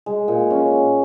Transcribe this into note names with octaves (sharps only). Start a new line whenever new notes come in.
G#3
A#2
C#4